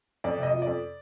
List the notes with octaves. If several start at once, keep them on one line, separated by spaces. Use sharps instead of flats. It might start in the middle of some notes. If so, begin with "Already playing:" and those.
F2 D5
C3
D#5
F3
F2 D5